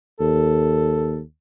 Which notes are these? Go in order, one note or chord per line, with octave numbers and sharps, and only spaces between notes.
D#2 A4